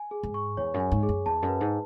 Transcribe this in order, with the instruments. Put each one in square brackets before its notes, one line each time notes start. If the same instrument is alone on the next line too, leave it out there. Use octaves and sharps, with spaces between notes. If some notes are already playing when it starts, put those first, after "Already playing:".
Already playing: [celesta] G#5
G#4
[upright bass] G#2
[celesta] C#6
[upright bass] E2 [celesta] C#5
[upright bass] F#2
[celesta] G#5
[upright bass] G#2
[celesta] G#4
[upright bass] F#2
[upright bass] E2 [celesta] A5
[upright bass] F#2
[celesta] B4
[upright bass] G#2